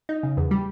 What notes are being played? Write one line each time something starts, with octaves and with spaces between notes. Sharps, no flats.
D#4
C#3
E2
G3